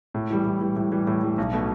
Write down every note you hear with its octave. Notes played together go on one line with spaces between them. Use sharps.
A2
E3 G3
A2
E3 G3
A2
E3 G3
A2
E3 G3
B1
B2 A3